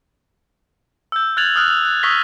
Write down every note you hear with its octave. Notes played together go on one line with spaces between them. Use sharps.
E6 G6
F6 F#6 G#6 A6 F7 F#7
D#6 F6 F#6
F7
F#6
C#6 D#6 E6 A#6 B6 G7